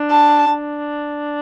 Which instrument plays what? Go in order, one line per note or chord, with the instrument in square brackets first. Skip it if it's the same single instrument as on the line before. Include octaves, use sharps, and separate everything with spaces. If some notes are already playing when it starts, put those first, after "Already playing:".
Already playing: [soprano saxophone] D4
[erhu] A5
[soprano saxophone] D4